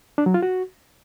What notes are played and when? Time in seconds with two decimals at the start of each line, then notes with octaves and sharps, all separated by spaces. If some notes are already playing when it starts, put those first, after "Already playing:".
0.18 D4
0.26 F#3
0.34 F4
0.43 F#4